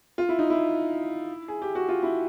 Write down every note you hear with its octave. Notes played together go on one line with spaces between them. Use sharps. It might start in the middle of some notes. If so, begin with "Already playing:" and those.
F4
E4
D#4
E4
G#4
G4
F#4
F4
E4